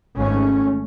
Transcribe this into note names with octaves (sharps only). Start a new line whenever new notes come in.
G#1 G#2 A3 C#4